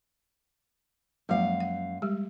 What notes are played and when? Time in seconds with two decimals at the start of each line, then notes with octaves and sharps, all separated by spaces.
1.29 F#2 F3 G#3 A#3 F5
1.60 F#5
2.02 G3 G#3 G4